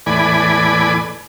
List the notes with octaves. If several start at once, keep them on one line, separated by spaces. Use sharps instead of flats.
E2 A2 D5 G#5 B5